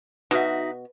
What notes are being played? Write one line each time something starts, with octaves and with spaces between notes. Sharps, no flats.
B2 D#4 F#4 E5